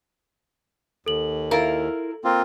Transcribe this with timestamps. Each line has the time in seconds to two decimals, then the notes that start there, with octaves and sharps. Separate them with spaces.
1.06 D#2 A4 F#7
1.51 E4 F4 A#4
2.25 A#3 C4 F4